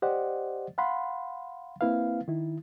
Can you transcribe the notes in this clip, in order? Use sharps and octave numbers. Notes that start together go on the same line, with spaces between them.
G4 C5 D5 D#5 F#5
F5 F#5 B5 C6
A#3 C4 E4 B4 F5
D#3 E4